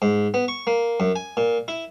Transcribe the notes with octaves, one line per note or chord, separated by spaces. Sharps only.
G#2
B3
C#6
A#3
F#2
G#5
A#2
E4